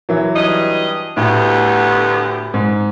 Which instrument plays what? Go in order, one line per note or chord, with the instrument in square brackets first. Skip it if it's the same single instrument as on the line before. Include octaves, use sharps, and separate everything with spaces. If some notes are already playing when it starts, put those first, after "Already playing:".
[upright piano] E3 F#3
[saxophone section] G2 D#5
[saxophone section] D2 B3 G4 [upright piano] A2
[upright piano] G#2